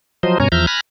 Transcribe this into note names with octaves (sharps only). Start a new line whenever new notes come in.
F3 F#3 C5 D#5
G2 B2 C#4 C#5 G#5 A#5
E2 F3 E5 A#5 F6 G6
G#5 B5 F6 F#6 A#6